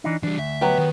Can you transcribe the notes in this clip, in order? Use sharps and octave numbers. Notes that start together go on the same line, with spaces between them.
E3 D4 D#4
E3 G3 D4
D2 E5
F#3 B3 G4
D#3